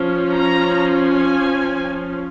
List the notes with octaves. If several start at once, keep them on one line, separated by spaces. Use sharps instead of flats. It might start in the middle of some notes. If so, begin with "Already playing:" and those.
Already playing: F3 C#4
A#5
G#5